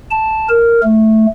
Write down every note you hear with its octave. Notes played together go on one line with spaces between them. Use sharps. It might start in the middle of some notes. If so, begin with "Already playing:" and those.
A5
A#4
A3